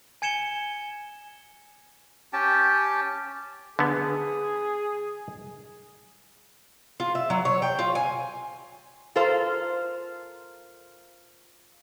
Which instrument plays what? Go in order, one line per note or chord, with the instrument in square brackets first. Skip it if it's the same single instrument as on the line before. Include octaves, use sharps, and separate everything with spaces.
[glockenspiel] G#5 G#6 C#7 E7 G7
[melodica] C#4 G4 G5 A5
[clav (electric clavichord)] D3 B3 [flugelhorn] G#4
[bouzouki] F4
E5
F#3
C#5
G5
F4
G#5
[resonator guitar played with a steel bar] F4 A4 A#4 C5 F5